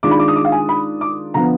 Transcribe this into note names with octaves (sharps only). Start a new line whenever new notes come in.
D#3 G#3 D4 F4 D6
B5
D6
D#6
D6
F5
G#5
B5
D6
D3 F3 B3 A#5